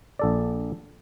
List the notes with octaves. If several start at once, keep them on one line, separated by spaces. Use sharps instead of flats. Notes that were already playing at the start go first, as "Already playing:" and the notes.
A#1 A4 D5